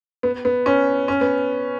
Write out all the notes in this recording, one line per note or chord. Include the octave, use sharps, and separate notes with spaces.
B3
B3
C#4
C#4
B3